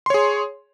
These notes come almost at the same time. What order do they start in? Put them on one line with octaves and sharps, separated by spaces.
C6 C#5 G#4